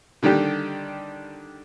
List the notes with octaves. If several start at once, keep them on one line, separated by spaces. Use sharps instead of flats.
D3 D#3 G3 D4 G4